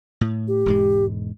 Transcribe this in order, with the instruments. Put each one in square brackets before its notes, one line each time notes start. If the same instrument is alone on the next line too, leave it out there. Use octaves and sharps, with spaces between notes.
[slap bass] A2
[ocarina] G4
[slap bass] E1 G#2 G#3